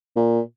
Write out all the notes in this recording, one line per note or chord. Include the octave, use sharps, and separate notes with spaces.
A#2